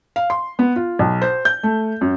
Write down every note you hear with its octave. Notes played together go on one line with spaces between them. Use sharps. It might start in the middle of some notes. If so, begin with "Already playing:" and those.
F5
C6
B3
F4
B1
C5
G6
A3
F#2